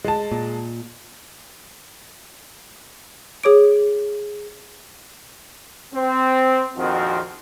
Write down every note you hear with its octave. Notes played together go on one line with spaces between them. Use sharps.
G#3 A5
A#2
G#4 C#5 D6 D7
C4
A#1 F2 D#3 F3 C4 F#4